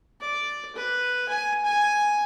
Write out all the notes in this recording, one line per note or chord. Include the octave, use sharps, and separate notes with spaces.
D5
B4
G#5
G#5